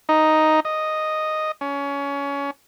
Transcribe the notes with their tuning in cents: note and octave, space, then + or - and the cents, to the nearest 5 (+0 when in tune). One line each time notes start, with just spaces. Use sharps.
D#4 +0
D#5 -5
C#4 +25